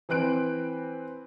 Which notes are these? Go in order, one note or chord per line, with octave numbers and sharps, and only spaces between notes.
E3 C4 B4 F#6 D7